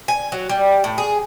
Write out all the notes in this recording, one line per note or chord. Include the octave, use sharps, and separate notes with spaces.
G#5
F#3
G3
A2
G#4